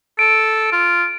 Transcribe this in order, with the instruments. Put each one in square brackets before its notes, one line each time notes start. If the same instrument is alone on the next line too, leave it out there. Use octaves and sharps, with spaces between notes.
[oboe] A4 [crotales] D7
[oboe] F4